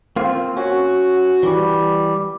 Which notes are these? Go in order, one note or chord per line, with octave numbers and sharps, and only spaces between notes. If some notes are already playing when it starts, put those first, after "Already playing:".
A#3 C4 F4
C#4 F#4
E3 G3